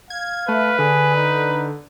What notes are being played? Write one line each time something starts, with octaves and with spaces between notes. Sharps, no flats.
F5 G#6
A3 B4
D3 G#4
D#4